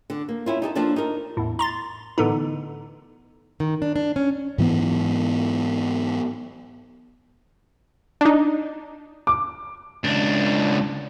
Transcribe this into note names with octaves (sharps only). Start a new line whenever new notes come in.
D3
A#3
C#4 E4 F4
D#4 G4 A4
F3 A#3 D4 F4 A4
D#4 A#4
E2 A2
A#5 C6 A6
A2 D3 E3 B3 D#4
D#3
D4
D4
C#4
G#2 E3 B3
D4 D#4
D6
C#2 D4